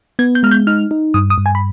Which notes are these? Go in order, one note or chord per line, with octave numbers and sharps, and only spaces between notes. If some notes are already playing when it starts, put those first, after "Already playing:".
B3 G#6
G6
G#3 F6
G6
D#4 F6
D#4
G2 D#6
D#6
G2
G#5
B5